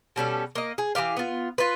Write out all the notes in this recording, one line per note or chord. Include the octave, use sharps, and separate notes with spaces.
B2 G3 C#4 A4
A#3 D#5
G#4
E3 B3 G4 F5
B3 F4
F4 B4